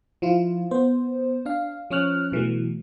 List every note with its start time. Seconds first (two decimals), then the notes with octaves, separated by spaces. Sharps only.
0.22 F3 E4 F4
0.71 B3 C5
1.46 D4 F5
1.91 F3 C#4 C#5 F6 F#6
2.32 B2 E3 F#3 A3